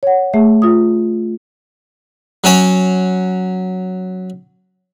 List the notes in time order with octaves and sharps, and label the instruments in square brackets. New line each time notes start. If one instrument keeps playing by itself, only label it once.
[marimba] C#5 F#5
A3 G#4 E5
F4 D#6
[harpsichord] F#3 C#4 C#5